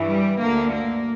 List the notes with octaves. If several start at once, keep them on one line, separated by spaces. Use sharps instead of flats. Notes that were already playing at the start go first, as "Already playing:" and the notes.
Already playing: G2 E3
G3
D2 D3 A#3
A#3